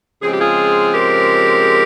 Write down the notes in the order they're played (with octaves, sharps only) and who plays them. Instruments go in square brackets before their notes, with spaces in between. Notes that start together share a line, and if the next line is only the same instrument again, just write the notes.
[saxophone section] C#3 F3 G#3 C4 G#4
G4
F4 G#4
G4 A#4